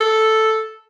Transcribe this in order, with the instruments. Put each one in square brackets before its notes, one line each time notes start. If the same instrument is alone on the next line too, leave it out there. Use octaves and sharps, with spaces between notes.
[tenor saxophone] A4